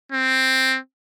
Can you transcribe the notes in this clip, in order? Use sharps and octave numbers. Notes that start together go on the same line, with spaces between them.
C4